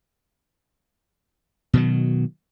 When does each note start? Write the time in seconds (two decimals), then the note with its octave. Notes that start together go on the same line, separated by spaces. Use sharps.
1.73 B2 D#3 F#3